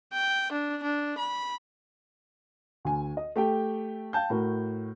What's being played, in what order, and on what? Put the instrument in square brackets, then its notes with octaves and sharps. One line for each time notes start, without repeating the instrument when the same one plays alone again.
[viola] G5
D4
D4
B5
[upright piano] D2 G#5
D#5
A3 G4 A4 G5
F5 G5 A5 G6
A2 A3 F#4 A#4